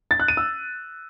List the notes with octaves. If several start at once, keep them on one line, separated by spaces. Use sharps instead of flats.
A6
F#6
D#7
E6